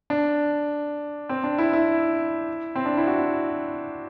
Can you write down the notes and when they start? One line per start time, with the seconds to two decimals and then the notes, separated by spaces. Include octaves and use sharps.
0.10 D4
1.29 C4
1.44 D4
1.58 E4
1.73 E4
2.75 C4
2.86 D4
2.97 E4
3.07 F#4